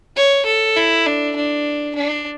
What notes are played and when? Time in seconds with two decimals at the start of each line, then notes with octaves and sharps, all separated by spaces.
0.16 C#5
0.46 A4
0.77 E4
1.06 D4
1.36 D4
1.95 D4